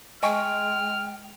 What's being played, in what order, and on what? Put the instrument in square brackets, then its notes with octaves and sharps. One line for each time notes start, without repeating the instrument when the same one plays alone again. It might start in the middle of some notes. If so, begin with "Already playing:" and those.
[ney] G#3 [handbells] D#5 G#5 C#6 [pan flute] G5 [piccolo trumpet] F6